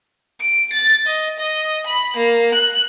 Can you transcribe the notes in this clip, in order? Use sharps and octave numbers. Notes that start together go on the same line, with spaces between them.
D7
A6
D#5
D#5
B5
A#3
F#6